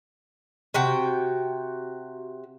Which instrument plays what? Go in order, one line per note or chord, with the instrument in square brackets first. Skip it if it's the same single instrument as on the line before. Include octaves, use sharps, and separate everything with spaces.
[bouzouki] C3 F#4 G5